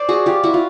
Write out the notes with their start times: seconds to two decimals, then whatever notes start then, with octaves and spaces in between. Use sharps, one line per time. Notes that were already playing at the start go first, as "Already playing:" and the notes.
Already playing: C5 D5
0.09 F#4 G#4
0.26 F4 G4
0.44 E4 F#4
0.54 F4